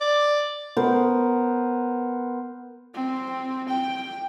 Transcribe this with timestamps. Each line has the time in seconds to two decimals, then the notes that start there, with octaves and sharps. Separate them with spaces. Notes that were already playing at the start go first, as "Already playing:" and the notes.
0.01 D5
0.77 B3 A#4 C5
2.94 C4
3.69 G5